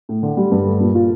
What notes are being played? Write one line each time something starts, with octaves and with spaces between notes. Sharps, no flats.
A2
D3
G3
G2
A3
A#2
F4